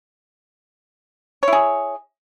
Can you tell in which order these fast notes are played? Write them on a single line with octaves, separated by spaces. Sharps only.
C#5 E4 G#4